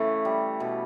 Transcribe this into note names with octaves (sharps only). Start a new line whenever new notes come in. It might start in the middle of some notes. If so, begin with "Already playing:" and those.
Already playing: C#3 E3 A3
G3
B2